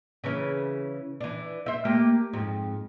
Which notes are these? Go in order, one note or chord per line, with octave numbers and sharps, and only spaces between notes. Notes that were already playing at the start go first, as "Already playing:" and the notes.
C#3 E3 C#4
E3 D4
C5 E5
A3 A#3 G4
F2 G#2